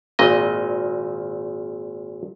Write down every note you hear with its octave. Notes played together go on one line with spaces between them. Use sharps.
G#1 A#2 D#5